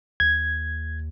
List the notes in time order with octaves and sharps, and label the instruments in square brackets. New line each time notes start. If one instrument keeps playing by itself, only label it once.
[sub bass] D#2 [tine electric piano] G#6